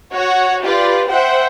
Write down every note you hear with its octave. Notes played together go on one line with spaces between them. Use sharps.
F#4 C#5 F#5
F4 G4 B4 D5
C5 E5 F#5 G5